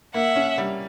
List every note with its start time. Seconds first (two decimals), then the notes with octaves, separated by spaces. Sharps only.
0.14 A#3 E5 F#5
0.36 C#4
0.58 G3